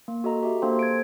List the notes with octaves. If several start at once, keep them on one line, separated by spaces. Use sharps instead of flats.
A#3
F#4 A4 D#5 A#5
F#4 G4 E5
A#3 D4 A4 C5 G5 C6
G#6 D7